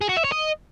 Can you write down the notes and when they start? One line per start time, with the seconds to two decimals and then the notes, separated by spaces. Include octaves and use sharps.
0.01 G#4
0.09 F#4
0.17 E5
0.24 C#5
0.32 D#5